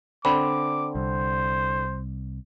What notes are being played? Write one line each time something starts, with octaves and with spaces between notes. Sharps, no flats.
D3 C4 B5 D6
C2 C5